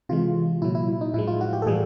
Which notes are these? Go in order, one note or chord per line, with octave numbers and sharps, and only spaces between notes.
C3 E3 G#3 F4
A#2 F#3 E4
E4
D#4
A2 F3 G#3 E4
F4
F#4
G4
A4
A2 E3 G3 G#4